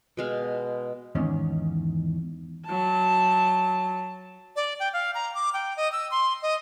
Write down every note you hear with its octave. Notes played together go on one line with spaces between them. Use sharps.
B2 G#3 F5
E2 G#2 D#3 C#4
F#3 A5
D5
G5
F5
A#5
D6
G5
D#5
E6
C6
D#5